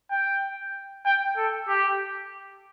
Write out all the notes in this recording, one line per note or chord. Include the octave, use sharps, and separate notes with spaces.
G5
G5
A4
G4